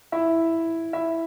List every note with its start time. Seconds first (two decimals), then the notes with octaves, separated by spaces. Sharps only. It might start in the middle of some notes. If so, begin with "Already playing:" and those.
0.12 E4 E5
0.93 E4 E5